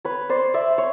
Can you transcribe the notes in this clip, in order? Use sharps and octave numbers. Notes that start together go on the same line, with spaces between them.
B4 C#5
C5 D5
D5 E5
C#5